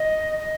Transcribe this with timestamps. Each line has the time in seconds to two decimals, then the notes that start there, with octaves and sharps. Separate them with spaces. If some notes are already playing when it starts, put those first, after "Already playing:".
Already playing: D#5
0.39 D#5